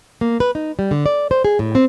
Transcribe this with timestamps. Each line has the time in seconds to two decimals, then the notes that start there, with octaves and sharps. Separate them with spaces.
0.21 A#3
0.40 B4
0.55 D#4
0.79 G3
0.91 D3
1.06 D5
1.31 C5
1.45 G#4
1.59 A2
1.75 C4